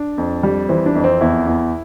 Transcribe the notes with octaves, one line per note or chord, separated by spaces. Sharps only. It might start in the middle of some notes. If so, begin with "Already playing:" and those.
Already playing: D4
F2
G3
E3 C4
D4
F2
C4
E2 E4
E2